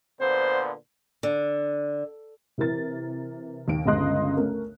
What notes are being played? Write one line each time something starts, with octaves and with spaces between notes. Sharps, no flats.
A#2 D3 B3 C5
D3
C3 E3 A#4 A6
D#2 D7
G1 C#2 C#3 D#5 C6 F#6
A3 C#4 A#4